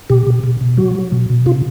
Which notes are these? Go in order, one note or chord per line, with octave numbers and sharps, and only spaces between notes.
B2 G4
B2
B2
B2
F#3 F#4
F#3
B2
B2
C3 F4